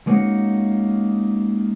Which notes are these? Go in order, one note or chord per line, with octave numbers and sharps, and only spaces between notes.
G#3 A#3 C#4 D#4 F#4